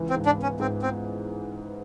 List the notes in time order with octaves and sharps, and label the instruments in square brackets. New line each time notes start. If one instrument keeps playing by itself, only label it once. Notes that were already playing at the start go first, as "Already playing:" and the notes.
Already playing: [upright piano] C#2 E3
[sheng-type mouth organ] C4
[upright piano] G#2
[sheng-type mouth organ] D4
[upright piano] B3 [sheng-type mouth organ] C#4
[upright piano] G#2 [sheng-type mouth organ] C4
[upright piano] B3 [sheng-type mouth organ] C4